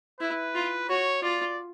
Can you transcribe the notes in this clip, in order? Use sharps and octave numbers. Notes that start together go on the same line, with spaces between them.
E4 B4
F4
F#4 C#5
F4 D5